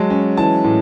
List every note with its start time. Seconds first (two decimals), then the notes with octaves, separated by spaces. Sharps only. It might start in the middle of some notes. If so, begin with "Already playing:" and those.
Already playing: F#3 G#3 A5
0.10 C#4
0.37 E3 A5
0.64 A2